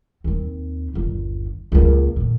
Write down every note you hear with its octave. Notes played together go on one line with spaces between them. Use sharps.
D#2 C4
G1 D#2
C#2 A#3
A#2 D3